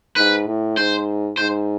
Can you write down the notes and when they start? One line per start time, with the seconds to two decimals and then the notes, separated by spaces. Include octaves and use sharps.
0.16 G#2 B4
0.47 A2
0.77 G#2 C5
1.37 G#2 C5